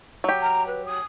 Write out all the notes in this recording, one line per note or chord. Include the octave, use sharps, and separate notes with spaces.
F#3 G4
A#5
B4
D#6